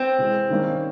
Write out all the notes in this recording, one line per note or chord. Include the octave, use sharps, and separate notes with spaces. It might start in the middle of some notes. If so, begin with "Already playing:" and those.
Already playing: C4
C3 E3 G#3
D#3 G3 A#3 C#4